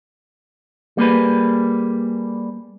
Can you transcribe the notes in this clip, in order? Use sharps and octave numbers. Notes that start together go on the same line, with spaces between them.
G3 A#3 G#4 B4